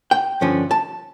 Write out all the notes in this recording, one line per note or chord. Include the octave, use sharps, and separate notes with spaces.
G5
G2 D3 F3 C#4
A5